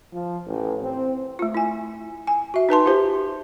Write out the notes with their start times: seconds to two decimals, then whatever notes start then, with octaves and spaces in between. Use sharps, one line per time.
0.13 F3
0.45 A1
0.82 C4
1.39 A3 F4
1.54 E4 G#5
2.27 G#5
2.54 F#4 E5
2.69 D#4 B4 A5 C6
2.86 F4 G4 C5